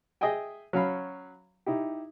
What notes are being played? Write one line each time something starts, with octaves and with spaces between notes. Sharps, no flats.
G#4 D#5 E5 G5 G#5
F#3 C#4 F5 B5
D#4 E4 G4